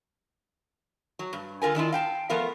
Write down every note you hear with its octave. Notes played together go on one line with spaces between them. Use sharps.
F#3
G2
D3 F4 A#4 G#5
D#3 D4 E4 F4
F5 G5 A5
F3 A3 B3 A#4 F5